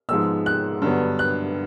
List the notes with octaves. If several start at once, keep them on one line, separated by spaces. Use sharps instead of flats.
G#2 F3 G#3 B3 E6
F#6
G2 D3 F#3 B3
F#6